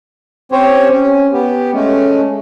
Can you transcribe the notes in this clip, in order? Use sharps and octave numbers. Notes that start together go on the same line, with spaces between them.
C4 C#4 G4 C5 C#5
C#4
B3 G4
G#3 A3 C#4